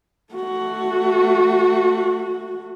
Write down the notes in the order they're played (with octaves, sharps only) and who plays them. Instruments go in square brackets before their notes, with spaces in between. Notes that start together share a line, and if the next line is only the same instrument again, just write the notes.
[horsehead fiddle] A3 F#4